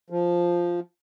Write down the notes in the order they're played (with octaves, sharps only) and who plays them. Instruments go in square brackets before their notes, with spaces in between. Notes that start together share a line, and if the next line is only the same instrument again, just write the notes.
[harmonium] F3